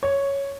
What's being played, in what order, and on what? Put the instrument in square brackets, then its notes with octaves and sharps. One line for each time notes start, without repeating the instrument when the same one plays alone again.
[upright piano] C#5